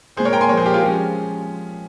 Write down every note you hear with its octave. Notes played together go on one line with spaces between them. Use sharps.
A#2 G#3 C4 G#4 C5
A#4 C#5
G5 A#5
G#5 C6
A#2 F3 G#3 A#4 C#5
G#4 C5
G4 A#4
F4 G#4
F3 G#3 C#4 G4